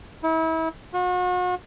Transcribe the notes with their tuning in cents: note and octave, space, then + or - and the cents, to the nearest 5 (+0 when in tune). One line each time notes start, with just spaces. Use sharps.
E4 -35
F#4 -40